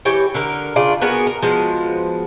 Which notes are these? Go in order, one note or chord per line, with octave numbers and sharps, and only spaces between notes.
E3 G4 C#5 G5
D3 A#4
C#3 D4 F4
B3 F#4 G#4 A#4
A#4
F3 G#3 B3 F#4